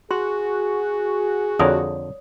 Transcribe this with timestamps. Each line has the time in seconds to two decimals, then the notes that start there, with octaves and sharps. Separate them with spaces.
0.11 F#4 G#4 C6
1.59 F2 D3 A#4 C#5 D5 D#6